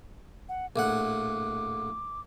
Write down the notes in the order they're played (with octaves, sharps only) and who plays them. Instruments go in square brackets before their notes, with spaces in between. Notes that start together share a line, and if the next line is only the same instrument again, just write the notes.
[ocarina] F#5
[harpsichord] A#1 A2 F#5 [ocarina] D6